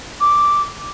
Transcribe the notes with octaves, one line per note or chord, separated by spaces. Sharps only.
D6